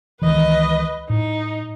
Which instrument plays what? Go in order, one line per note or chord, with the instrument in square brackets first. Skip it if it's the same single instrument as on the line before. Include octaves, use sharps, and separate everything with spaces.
[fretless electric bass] C#2 D#3 E3 [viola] B4 D#5
[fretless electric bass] A2 [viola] D#4